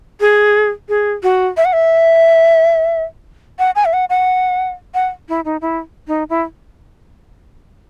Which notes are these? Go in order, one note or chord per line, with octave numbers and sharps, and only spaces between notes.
G#4
G#4
F#4
E5
F#5
E5
F#5
G#5
E5
F#5
F#5
F#5
E4
D#4
E4
D#4
E4